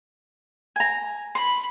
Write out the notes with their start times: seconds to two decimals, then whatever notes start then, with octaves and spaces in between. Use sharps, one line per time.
0.76 G#5 A#5
1.35 B5 C6